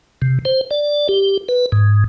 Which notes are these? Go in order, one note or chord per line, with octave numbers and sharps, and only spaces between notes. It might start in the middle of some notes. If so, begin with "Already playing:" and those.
C3
C5
D5
G4
B4
G#2